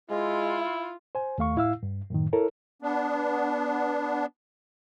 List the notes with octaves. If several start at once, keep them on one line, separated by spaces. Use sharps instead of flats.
G#3 E4 F4
C5 G#5
D#2 A3 F5 C#6
A2 E4 F5 E6
G2
F#2 A2 D#3
E4 A4 A#4 C#5
B3 D4